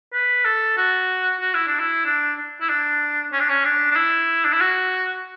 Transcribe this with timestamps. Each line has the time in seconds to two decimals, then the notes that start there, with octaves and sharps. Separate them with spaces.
0.14 B4
0.45 A4
0.78 F#4
1.41 F#4
1.54 E4
1.68 D4
1.80 E4
2.06 D4
2.61 E4
2.69 D4
3.33 C#4
3.40 D4
3.49 C#4
3.65 D4
3.91 D4
3.96 E4
4.45 D4
4.53 E4
4.60 F#4